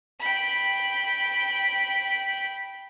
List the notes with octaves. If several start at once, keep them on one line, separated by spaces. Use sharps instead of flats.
G5 B5